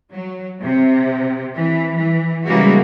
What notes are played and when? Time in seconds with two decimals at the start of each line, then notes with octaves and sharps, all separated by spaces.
0.11 F#3
0.62 C3
1.57 E3
1.98 E3
2.45 C#3 E3 G3 G#3 A#3 F#4